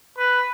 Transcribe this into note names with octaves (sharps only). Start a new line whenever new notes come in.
B4